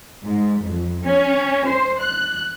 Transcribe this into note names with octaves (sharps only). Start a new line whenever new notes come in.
G#2
F2
C#4
C5
F#6